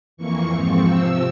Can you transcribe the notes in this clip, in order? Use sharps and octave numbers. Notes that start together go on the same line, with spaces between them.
F2 E3 A#3 C#6
G#2 F3 C4 C#6
C3 F3 C4 E6